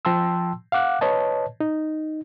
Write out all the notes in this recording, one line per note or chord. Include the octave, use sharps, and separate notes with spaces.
F3 G5 A5 C6 E6
F5 F#5 D6 F#6
B4 C#5 D#5 A5
D#4